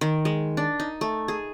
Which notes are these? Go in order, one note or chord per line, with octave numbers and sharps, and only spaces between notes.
D#3
G#3
D4
D#4
A3
G#4